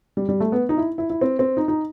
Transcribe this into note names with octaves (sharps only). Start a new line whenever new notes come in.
G3
G3
A3
B3
D#4
E4
E4
E4
C4
C4
D#4
D#4